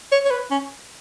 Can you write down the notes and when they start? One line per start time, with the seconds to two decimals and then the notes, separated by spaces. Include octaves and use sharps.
0.12 C#5
0.25 C#5
0.31 B4
0.51 C#4